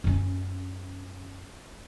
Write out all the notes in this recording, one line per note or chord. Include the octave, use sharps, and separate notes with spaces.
F#2 C#4